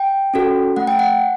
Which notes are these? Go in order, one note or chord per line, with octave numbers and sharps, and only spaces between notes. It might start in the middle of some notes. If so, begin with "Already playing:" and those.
Already playing: G5
C#4 F#4 A4
A3 F#5
G5
F#5